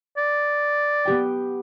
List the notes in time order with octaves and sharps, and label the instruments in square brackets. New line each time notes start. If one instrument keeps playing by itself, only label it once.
[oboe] D5
[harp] B3 G4 G5